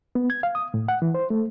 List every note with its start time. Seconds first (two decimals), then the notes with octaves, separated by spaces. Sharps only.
0.15 B3
0.30 G#6
0.43 F5
0.55 D#6
0.74 A2
0.88 F#5
1.02 E3
1.14 C5
1.30 A3